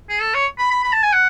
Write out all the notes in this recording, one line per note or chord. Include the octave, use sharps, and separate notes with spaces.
G#4
A4
C#5
B5
B5
B5
A5
G#5
F#5